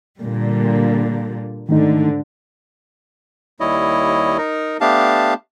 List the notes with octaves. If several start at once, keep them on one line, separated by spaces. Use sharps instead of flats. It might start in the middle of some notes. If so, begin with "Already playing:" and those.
A#2 D3 G3
G#2 D3 D#3 A3 D#4
D#2 G3 E4 C#5 D#5
D#4 A#4
A3 B3 D4 G4 F5 A5